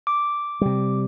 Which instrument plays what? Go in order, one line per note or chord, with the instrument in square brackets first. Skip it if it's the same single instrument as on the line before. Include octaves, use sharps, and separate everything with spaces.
[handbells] D6
[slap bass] C3 G3